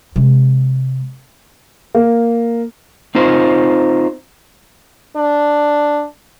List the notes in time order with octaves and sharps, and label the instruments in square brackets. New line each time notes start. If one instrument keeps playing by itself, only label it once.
[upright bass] C3 G#3
[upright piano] A#3
[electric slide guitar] C4 D#4 F4 C5
[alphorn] D4